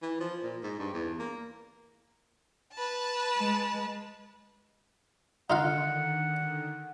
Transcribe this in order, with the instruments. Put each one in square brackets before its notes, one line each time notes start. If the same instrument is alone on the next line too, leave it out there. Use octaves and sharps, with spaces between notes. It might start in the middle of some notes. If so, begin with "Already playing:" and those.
[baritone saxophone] E3
F3
A#2
G#2
G2
E2
A#3
[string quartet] B4 A5
[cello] G#3
[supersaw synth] D3 D#3 [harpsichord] D#4 F4 F5 [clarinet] F#5